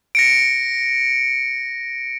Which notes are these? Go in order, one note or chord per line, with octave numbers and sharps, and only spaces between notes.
A#6 C#7 D7